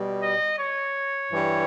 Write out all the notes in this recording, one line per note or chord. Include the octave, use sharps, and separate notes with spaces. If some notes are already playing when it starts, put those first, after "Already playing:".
Already playing: B2 G3
D#5
C#5
G2 E3 G3